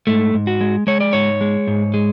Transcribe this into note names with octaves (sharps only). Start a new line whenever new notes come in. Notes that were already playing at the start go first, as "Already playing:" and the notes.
G#2 A3
G#2
F#4
G#3
G#3 C#5
D5
G#2 C#5
G#3
G#2
G#3